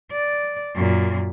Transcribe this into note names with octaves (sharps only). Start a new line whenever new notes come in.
D5
F#2 A#2